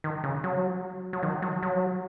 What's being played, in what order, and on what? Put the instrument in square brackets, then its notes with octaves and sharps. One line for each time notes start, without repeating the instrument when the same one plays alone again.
[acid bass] D#3
C#3
F#3
F#3
D#3
F#3
F#3